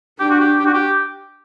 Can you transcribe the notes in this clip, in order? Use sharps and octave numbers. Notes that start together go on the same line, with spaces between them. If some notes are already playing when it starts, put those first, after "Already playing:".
D4 G4
F#4
G4
G4
F#4
G4